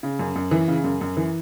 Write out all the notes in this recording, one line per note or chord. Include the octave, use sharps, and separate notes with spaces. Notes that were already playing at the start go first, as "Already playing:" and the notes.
C#3
F#2
F#2
E3
C#3
F#2
F#2
E3